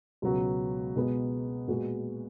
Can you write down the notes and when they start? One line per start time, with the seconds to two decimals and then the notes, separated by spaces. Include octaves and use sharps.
0.22 C#2 B2 F#3 B3 F#4
0.95 B2 G#3 B3
1.68 A#2 G#3 B3 F#4